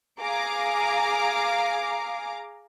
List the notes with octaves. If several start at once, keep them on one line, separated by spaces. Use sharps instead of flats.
G#4 F5 A#5 D6